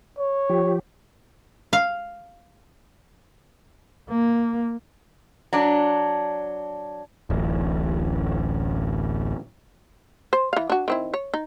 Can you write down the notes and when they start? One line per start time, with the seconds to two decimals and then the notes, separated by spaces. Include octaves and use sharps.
0.18 C#5
0.50 F3 G4
1.73 F5
4.10 A#3
5.53 F#3 D4
7.30 D1 A1
10.33 C5
10.53 E3 F5
10.70 D4 F#4
10.88 D#3 C4 E4
11.14 C#5
11.34 D#4